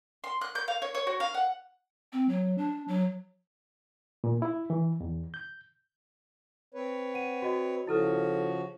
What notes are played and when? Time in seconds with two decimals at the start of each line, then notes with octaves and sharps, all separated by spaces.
0.24 C6
0.41 F#6
0.55 G6
0.68 F5
0.82 C#5
0.95 C#5
1.07 F#4
1.20 F5
1.34 F#5
2.13 C4
2.29 F#3
2.58 D4
2.88 F#3
4.24 A#2
4.42 E4
4.70 E3
5.00 E2
5.34 G6
6.74 C4 B4 C#5
7.14 F#5 D#7
7.42 F#4 D#5
7.87 C#3 F3 E4 F#4 A4 F6